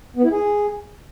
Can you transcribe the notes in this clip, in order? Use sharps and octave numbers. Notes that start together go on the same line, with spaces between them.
B3
E4
G#4